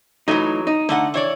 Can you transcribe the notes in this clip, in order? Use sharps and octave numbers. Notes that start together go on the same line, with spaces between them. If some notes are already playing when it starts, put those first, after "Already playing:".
E3 F#3 A3 D#4
D#4
D3 A3 D#4 F#5
E3 C#5 D5